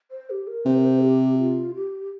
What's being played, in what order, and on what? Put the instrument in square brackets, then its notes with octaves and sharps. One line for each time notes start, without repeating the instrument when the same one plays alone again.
[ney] C5
G4
A#4
[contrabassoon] C3 [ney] C5
[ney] A#4
C5
G4
F4
G4